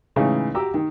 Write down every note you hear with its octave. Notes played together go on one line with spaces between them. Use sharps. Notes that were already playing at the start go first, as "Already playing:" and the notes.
A2 C#3 E3 G#3 D#4 G#4
F#4 G4 A#5 D6 E6
D#3